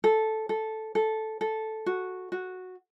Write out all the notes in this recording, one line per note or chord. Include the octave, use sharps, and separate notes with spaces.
A4
A4
A4
A4
F#4
F#4